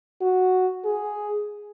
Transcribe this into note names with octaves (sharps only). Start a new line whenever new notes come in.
F#4
G#4